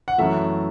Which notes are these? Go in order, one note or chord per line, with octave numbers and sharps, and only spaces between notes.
F#5
F#2 E3 A3 E5